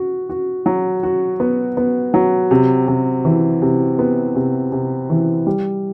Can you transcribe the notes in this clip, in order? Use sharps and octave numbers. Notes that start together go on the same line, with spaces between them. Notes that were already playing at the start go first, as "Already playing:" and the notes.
Already playing: F#4
F#4
F#3
F#4
B3
B3
F#3
C3
C3
E3
C3
B3
C3
C3
E3
G3